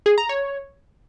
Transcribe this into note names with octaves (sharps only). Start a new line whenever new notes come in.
G#4
A#5
C#5